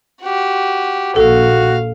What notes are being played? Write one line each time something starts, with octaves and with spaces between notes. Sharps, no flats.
F#4 G4
A#1 F#4 A4 F5